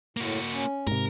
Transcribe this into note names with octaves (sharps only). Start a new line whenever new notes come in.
A2 A#3 F#4
C#4
G#2 C3 A#4